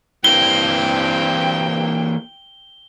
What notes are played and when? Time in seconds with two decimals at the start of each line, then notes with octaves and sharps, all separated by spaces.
0.24 G2 E3 A#3 C4 G5 G7